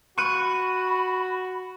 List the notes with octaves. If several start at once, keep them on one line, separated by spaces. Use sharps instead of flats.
F#4 B5 C#6 F#6 D#7